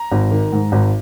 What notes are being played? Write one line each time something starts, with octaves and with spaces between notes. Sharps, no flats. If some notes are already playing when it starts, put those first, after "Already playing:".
Already playing: A#5
G#1
D#3
G#2
G#1